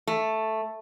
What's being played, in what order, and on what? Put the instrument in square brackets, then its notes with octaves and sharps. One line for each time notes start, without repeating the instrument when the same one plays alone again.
[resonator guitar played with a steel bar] A3